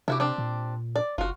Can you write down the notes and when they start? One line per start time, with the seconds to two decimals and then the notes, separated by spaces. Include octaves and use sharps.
0.08 C3 E4 F#4 G4
0.20 C4 D4 G4
0.38 A#2
0.96 D5
1.18 F#1 F4 F#4